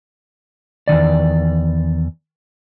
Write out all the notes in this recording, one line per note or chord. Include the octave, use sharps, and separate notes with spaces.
E2 G2 D#3 D5